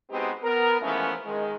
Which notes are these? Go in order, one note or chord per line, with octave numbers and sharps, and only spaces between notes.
G#3 B3 C4 D#4 F#4 G4
B3 A#4
E3 F3 G#3 A3 B3 C#4
D#3 G#3